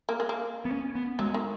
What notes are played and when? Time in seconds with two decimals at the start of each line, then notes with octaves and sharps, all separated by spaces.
0.09 A#3
0.20 G#3
0.29 A#3
0.65 B3
0.72 C#4
0.95 B3
1.19 F#3 G#3
1.34 D#3